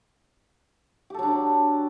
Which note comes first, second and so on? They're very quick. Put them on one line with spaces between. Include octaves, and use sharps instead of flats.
G4 A4 F#3 D4